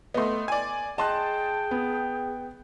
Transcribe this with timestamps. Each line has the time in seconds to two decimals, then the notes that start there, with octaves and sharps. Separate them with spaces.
0.14 A3 B3 D#5 C6
0.48 D5 G#5
0.98 G#4 D#5 G5 A5 C6 F#6
1.71 B3